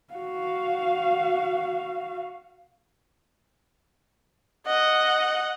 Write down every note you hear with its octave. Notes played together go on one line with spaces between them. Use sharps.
F#4 F5
D#5 F#5